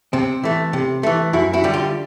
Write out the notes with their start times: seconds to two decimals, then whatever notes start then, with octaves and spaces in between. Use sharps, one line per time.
0.13 C3 C4
0.43 E3 A3
0.73 C3
1.03 E3 A3
1.33 F#2 E4 F#4
1.53 E4 F#4
1.64 D3 G3
1.74 F4 G4